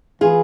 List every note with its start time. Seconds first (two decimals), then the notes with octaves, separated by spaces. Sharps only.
0.21 E3 F4 G#4